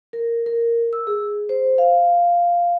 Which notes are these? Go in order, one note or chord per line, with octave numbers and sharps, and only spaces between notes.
A#4
A#4
E6
G#4
C5
F5